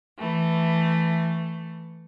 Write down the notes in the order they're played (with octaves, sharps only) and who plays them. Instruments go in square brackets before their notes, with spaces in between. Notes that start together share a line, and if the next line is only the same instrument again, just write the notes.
[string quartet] E3 A3